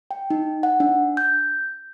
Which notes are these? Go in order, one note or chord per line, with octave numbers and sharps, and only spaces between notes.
G5
D#4
F#5
D4
G6